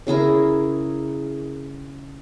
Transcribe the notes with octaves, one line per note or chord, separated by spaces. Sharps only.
C#3 E4 G#4 A#4